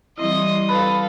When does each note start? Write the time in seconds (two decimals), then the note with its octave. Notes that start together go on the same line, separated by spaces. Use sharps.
0.18 E3 G3 C4 E4 D#5 C6 D#6
0.69 A4 B4 F5